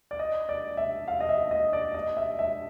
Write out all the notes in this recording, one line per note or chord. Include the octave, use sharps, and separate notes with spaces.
D5
D#5
D5
E5
F5
D#5
E5
D#5
D5
D#5
E5
E5